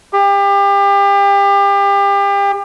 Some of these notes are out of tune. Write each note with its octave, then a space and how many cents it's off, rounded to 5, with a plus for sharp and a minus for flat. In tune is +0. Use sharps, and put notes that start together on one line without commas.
G4 +30